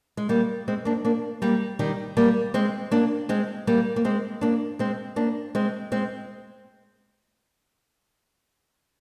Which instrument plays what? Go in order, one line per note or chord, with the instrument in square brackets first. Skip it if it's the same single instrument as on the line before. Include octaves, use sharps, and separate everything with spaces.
[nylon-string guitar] G#3
G3 A#3
G#3 C4
A#3 D4
A#3 D4
G3 A#3
D#3 G3
G3 A#3
G#3 C4
A#3 D4
G#3 C4
G3 A#3
A#3
G#3 C4
A#3 D4
G#3 C4
A#3 D4
G#3 C4
G#3 C4